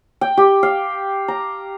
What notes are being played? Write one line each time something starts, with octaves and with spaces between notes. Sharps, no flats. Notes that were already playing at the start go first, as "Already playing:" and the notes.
G5
G4
F5
A#5